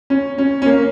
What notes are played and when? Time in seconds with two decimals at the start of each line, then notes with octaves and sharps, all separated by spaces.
0.10 C#4
0.38 C#4
0.62 C#4
0.66 A#3